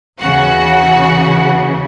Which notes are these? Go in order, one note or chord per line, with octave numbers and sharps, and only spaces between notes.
D#2 C#3 E3 F#4 F#5